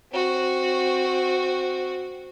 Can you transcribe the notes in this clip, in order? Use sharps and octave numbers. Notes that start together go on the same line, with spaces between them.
C4 F#4